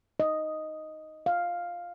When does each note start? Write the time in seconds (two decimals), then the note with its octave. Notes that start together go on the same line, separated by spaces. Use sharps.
0.20 D#5
1.26 F5